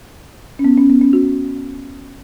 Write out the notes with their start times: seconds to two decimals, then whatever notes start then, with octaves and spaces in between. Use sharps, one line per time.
0.59 C#4
0.64 B3
0.78 C#4
0.90 B3
1.01 C#4
1.13 F#4